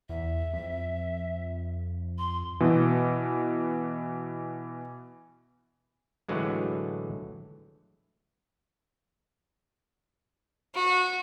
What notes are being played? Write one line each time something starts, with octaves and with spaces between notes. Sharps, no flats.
E2 E5
F2
C6
B2 E3
A2 D3 E3 F#3 G#3
F#4